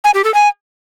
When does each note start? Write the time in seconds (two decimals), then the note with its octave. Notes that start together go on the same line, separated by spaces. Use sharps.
0.04 G#5
0.14 G4
0.24 A4
0.34 G#5